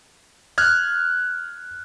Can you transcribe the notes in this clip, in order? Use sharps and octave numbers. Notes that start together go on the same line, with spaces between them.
F6 F#6 G#6